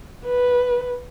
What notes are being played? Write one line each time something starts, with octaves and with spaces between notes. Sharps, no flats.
B4